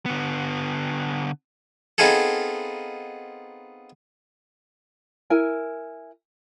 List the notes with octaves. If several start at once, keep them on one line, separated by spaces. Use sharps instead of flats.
D3 B3
B3 C4 D#4 F4 G#4 A4
E4 A#4 G#5